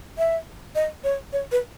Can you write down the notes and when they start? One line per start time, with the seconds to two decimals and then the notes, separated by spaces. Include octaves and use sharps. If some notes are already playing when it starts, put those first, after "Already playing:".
0.18 E5
0.75 D#5
1.04 C#5
1.33 C#5
1.52 B4